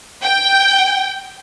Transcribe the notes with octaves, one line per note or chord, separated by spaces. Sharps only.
G5